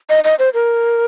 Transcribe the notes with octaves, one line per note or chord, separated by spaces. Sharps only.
D#5
D#5
C5
A#4